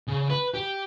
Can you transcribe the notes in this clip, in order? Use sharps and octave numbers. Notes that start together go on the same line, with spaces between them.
C#3
B4
G4